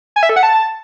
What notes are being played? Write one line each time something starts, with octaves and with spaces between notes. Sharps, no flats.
G#5
E5
A4
F#5
A5